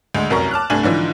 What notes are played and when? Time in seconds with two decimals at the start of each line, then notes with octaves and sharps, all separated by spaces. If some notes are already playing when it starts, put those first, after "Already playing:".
0.15 D2 G#3
0.29 F1 C2 F#2 A#4 A#5 C#6
0.51 A5 D6 F6 F#6
0.70 C2 G2 A3 D4 G#5 F#7
0.83 G#2 D3 E3 F3